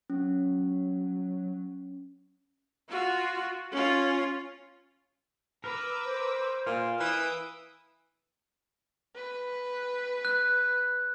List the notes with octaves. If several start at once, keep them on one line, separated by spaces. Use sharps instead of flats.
F#3 C#4
F4 F#4
C#4 F4
A#4 B4 D6 E6
C5
A#2 F5
E3 D#6 E6 D7
B4
F#6